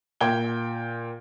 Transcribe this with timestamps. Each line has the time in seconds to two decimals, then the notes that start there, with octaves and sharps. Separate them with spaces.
0.21 A#2 G5 G#6 G7